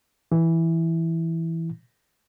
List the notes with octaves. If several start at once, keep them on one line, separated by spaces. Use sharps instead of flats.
E3 E4